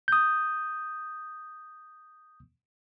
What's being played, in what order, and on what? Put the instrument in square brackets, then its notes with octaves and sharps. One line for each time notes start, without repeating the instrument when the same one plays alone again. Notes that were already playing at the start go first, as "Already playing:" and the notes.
[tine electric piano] D#6 G6